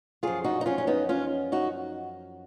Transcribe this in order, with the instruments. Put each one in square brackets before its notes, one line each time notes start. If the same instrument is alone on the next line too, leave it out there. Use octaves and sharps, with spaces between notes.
[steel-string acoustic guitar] F#2 F3 F4 G#4
D#4 F#4
D#4
C#4 F4
C#4
B3 D#4
C#4 F4
D#4 F#4